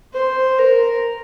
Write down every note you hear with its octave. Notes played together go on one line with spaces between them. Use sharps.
C5
A#4